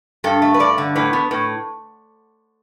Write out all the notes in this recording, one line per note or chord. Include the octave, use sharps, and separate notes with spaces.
G2 A4
A3
B4
G2 D5
D3
A2 B4
B3
A2